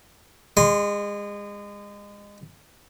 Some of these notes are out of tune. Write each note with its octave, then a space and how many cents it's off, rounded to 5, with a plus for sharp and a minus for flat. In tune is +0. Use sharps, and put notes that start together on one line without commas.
G#3 -30 C6 +0